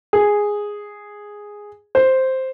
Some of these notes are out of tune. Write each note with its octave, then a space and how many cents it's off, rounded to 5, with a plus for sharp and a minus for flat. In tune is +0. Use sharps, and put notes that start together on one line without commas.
G#4 -5
C5 +0